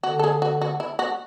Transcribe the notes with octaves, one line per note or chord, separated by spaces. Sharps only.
D3 F#4
A4
G#4
F#4
F#4
E4
F#4